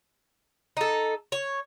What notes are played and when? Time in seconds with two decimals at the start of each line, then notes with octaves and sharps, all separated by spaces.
0.77 D#4 A4
1.32 C#5